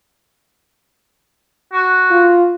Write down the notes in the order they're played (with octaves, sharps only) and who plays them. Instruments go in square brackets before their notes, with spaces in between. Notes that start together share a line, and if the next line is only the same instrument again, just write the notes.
[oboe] F#4
[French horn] F4